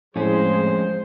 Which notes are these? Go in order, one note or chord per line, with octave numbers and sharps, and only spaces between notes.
F2 A2 G#3 C#4 C5